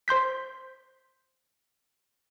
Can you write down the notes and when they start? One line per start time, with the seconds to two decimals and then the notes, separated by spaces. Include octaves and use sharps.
0.08 C5 C6 G6 B6